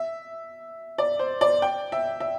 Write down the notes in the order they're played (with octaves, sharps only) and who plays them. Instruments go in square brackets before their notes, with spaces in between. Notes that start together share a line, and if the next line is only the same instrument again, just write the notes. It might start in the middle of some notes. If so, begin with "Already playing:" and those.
Already playing: [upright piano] E5
D5
C5
D5
G5
E5
E5